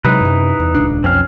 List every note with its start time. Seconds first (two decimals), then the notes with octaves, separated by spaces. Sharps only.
0.05 C3 F#3 G#3 D#4 E4 B4
0.21 F#2 C3
0.60 E2
0.75 D#1 C#2 D4
1.04 B1 F2 C4 C#4 F5